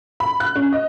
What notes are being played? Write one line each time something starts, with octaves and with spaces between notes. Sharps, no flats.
B5
F#6
C#4
D#5